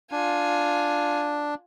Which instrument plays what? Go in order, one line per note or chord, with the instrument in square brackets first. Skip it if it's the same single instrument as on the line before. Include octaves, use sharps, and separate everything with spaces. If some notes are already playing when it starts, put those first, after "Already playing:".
[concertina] D4 [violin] F4 G#5